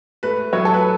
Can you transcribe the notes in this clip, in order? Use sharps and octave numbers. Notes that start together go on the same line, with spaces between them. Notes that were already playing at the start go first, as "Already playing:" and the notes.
A3 B4
F#3 C#5
A4
B4